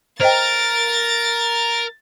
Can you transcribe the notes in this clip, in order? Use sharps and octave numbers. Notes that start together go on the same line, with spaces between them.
A#4 C5 D#5 G5 A6